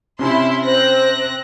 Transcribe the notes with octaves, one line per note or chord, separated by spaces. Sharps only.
C3 C#4 E4 C6
C4 C5 F#6 A#6